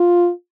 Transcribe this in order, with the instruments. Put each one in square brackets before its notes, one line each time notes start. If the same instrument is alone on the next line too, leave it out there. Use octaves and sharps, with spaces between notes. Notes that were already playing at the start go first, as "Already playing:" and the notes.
Already playing: [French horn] F4